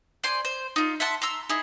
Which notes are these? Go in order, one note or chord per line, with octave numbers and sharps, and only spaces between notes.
C5 D5 G#5 C6
C5
D#4 F4
E5 F#5 A5 C6
A#5 C6 E6
D#4 E4 G#4